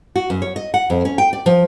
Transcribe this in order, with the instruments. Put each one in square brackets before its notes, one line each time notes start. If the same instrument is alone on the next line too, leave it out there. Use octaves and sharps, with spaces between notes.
[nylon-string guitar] F#4
F#2
C#5
D#5
F#5
F2
C#4
G5
D5
F3